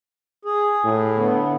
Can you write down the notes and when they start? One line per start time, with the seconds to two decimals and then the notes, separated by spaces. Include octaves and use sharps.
0.45 G#4
0.85 A2
1.17 D3 B3